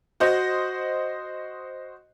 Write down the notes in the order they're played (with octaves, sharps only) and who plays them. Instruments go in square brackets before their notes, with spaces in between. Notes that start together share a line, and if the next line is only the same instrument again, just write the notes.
[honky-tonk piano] F#4 C5 D#5